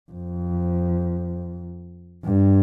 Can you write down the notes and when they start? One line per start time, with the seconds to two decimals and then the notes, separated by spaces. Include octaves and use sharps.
0.12 F2
2.24 G2